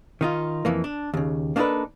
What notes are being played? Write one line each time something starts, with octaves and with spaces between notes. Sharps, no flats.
D#3 D#4 F4
F2 E3 A#3
D4
D#2 C#3
A#3 D4 D#4 F#4 A4 B4